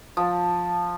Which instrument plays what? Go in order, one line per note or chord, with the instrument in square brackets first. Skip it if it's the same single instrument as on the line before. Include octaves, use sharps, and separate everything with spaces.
[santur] F3